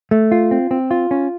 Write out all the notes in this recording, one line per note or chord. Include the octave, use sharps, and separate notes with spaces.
A3
F4
C4
C4
F4
C#4